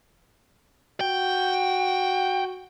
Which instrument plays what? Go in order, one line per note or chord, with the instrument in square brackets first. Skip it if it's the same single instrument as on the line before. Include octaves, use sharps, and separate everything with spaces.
[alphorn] F#4 [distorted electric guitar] G5